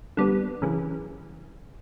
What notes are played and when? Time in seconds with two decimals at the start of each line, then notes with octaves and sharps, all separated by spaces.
0.17 D3 G3 B3
0.62 F#2 C#3 E3